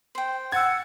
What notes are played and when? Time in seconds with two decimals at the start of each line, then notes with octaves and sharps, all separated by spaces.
0.15 C5 G5
0.52 F#5 E6 G#6 A6